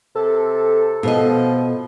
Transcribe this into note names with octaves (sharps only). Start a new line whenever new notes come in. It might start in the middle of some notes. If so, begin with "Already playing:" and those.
C3 A4
B2 F3 D#5